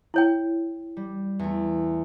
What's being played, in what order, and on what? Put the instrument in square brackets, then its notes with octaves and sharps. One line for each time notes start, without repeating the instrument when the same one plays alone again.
[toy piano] E4 C#5 G5
[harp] G3
E2 A3